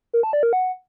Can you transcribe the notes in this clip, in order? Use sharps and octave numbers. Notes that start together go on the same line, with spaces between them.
A#4
A5
D5
A#4
F#5